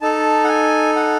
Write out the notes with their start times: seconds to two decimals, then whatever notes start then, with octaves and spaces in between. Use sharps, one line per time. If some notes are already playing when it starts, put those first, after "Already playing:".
0.01 D#4 A4 A5
0.44 F#5
0.48 G#5
0.96 F#5